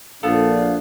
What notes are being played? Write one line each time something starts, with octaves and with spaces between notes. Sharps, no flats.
A#1 A3 B3 D4 F5